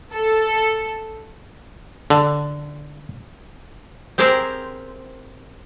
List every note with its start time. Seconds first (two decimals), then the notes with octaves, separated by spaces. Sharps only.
0.13 A4
2.10 D3
4.18 C4 G4 G#4 A#4 C5